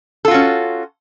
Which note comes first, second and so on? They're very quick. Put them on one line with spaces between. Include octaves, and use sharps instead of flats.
A4 F4 F#4 C#4